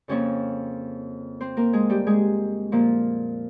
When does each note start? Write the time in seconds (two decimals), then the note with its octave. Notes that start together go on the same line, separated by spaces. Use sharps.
0.08 F2 C#3 F3 A#3 C#4 C#5
1.41 C4 C5
1.57 A#3 A#4
1.73 G#3 G#4
1.90 G3 G4
2.07 G#3 G#4
2.72 A#2 F3 A#3